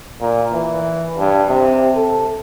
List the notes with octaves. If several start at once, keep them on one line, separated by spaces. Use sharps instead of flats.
A#2
E3
G2
C3
A4